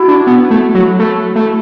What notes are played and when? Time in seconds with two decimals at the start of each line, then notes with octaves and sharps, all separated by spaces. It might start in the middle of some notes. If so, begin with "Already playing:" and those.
Already playing: E4 F#4
0.08 D4
0.27 B3
0.50 A3
0.75 F#3
0.99 A3
1.36 A3